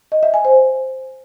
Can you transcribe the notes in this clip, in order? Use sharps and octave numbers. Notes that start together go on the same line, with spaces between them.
D#5
E5
G#5
C5